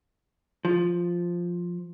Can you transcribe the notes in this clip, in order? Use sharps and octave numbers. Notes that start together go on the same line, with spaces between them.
F3